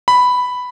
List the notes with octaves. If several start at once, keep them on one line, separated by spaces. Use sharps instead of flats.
B5